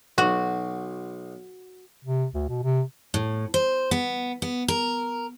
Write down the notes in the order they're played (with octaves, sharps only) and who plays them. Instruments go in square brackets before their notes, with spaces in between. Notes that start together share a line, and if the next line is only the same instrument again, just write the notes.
[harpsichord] B1 [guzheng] F#4
[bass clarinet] C3
D2
B2
C3
[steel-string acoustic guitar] A2
C5
B3
B3
A#4